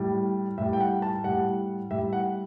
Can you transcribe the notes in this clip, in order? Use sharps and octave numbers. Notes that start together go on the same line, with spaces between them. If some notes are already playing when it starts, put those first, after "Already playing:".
Already playing: A2 G3
A2 G3 E5
G5
F#5
A5
A2 G3 F#5
A2 G3 E5
F#5